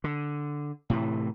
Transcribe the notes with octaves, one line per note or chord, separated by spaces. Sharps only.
D3
A2 C3 E3